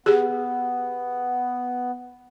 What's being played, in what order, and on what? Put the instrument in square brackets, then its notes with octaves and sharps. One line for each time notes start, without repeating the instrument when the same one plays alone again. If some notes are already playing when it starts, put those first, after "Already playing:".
[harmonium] B3 [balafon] G4 G#4